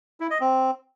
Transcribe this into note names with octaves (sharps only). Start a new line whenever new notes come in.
E4
D#5
C4